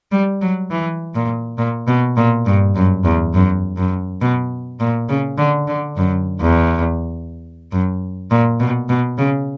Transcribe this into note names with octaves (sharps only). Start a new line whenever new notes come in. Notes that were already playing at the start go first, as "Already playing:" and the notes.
G3
F#3
E3
A#2
A#2
B2
A#2
G2
F#2
E2
F#2
F#2
B2
A#2
C#3
D3
D3
F#2
E2
F#2
A#2
B2
B2
C#3